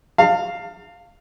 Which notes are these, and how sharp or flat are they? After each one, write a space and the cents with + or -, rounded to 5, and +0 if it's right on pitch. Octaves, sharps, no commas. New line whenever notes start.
F5 +0 A5 +35